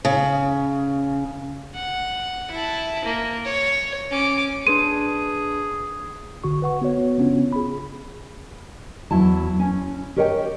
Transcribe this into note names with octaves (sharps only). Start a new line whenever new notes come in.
C#3
F#5
E4 A5
A#3
C#5
C#4 D6
D4 G#4 B4 C6 D#7
A#1 D3 F#4 C#6
B4 F#5 C#6
B3 F#4 C#5
C#3 B3 C#4 D4 F4
G#4 B5
E2 F#3 E4 A5
C#4
G4 A#4 C#5 D#5 F5 G5